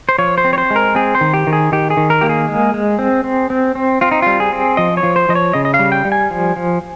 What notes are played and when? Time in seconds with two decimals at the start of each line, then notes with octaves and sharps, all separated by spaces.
0.09 C5
0.18 F3 C#5
0.38 C5
0.44 C4
0.53 C#5
0.58 C5
0.71 G#3
0.76 A#4
0.95 C4 G#4
1.15 C5
1.21 D#3
1.34 G4
1.47 D#3
1.53 G#4
1.72 D#3 G4
1.90 G#4
1.97 D#3
2.10 A#4
2.21 A#3 G4
2.29 G#4
2.49 G#3
2.74 G#3
2.99 C4
3.24 C4
3.50 C4
3.75 C4
4.01 C4 F4
4.12 D#4
4.22 G3 F4
4.40 G#4
4.53 C4
4.77 F3 D#5
4.97 C#5
5.03 F3
5.16 C5
5.29 F3 D#5
5.35 C#5
5.53 C#3 D#5
5.65 D#5
5.74 F5
5.79 G3
5.92 G5
6.05 G3
6.12 G#5
6.31 F3
6.56 F3